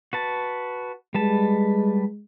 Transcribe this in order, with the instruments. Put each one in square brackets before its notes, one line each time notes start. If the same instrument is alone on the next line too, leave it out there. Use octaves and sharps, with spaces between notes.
[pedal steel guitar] F#4 B4 A5
[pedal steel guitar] G3 B4 A5 [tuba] G#3